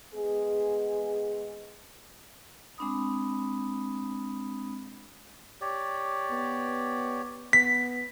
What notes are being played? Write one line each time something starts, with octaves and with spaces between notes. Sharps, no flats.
G#3 B3 G#4
G#3 C4 D4 B5 D#6
G4 C#5 D5
B3
B3 B6